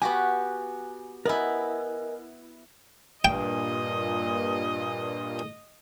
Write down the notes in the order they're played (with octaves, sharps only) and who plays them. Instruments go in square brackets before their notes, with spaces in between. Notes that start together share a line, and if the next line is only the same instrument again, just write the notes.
[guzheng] B3 F#4 G4 [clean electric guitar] G#5
[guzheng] B3 E4 [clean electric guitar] A#4 D#5 G#5
[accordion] G2 A#2 [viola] D#5 [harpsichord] G5